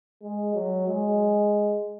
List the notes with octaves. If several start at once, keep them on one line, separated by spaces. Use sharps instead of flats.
G#3
F#3
G#3